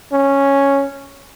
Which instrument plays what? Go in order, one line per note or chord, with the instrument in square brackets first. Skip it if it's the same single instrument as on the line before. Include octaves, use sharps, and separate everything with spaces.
[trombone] C#4